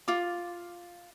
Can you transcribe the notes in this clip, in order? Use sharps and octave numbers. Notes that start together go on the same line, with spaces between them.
F4 D6